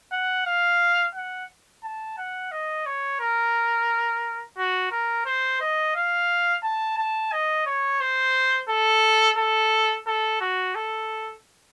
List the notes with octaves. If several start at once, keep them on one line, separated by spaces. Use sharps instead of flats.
F#5
F5
F#5
A5
F#5
D#5
C#5
A#4
F#4
A#4
C5
D#5
F5
A5
A5
D#5
C#5
C5
A4
A4
A4
F#4
A4